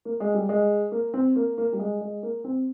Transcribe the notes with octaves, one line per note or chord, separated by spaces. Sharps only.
A#3
G#3
G3
G#3
A#3
C4
A#3
A#3
G3
G#3
G#3
A#3
C4